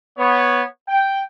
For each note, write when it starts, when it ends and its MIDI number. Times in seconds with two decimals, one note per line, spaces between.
0.18 0.62 59
0.18 0.62 73
0.87 1.20 79